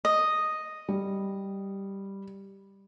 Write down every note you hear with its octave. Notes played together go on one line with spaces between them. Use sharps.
D#5
G3